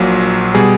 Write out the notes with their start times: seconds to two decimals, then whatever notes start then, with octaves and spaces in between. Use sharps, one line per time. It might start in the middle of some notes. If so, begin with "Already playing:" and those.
Already playing: A#1 A#2 F#3
0.55 B2 G3 G#4